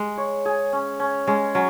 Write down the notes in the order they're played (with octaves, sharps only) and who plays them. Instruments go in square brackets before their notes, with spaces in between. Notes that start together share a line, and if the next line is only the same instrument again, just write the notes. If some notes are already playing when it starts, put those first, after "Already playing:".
Already playing: [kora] G#3
[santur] C#5
G#4
C#4
C#4
[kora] G#3 [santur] C#4
[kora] F#3 [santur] C#4